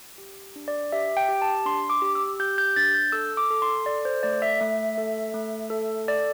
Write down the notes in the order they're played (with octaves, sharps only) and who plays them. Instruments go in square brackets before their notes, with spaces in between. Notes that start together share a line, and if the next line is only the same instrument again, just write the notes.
[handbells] G4
D4
D5
G4 E5
G5
G4
A5
D4 C6
D6
G4
E6
G4 G6
G6
D4 A6
G6
A4 E6
D6
A4
C6
A4 D5
C5
A3 D5
E5
A3 E5
A4
A3
A4
A4 D5